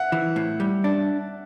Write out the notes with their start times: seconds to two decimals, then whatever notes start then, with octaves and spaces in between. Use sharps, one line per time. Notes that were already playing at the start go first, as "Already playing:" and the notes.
Already playing: E5 F#5
0.12 E3
0.36 A2
0.60 G3
0.84 D4